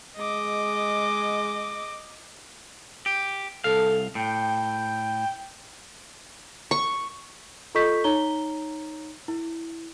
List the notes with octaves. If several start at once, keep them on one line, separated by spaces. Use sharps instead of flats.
G#3 D#5 D6
G4
C2 A4 F5
A2 G5
C#6
F4 A4 D#5 C#6 G6 B6
D#4 C#5 A#5 G7
E4